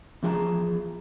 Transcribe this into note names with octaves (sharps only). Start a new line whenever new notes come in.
E2 F3 G#4 F#5 A5 A#5